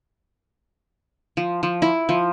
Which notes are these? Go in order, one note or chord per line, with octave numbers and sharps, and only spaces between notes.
F3
F3
E4
F3